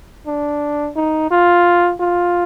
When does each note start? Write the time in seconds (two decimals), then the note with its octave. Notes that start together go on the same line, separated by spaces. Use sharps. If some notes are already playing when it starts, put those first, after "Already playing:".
0.27 D4
0.96 D#4
1.31 F4
2.00 F4